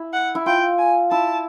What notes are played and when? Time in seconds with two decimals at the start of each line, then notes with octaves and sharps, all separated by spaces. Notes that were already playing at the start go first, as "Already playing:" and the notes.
Already playing: E4
0.13 F#5
0.35 E4
0.46 F4 G5
0.79 G#5
1.11 E4 A5